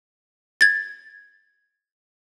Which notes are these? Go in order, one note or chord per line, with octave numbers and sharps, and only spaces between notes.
G#6 A6